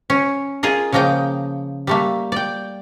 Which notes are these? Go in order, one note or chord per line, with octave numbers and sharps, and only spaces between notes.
C#4
F4 G#4 A#4 D#5
C#3 F3 A#3 D#5 G5
G3 A3 A#3
D5 G5